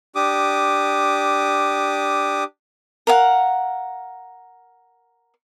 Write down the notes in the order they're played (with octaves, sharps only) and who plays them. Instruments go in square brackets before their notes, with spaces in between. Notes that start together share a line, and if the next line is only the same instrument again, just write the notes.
[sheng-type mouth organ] D4 G4 D6 D#6
[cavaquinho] A#4 F5 F#5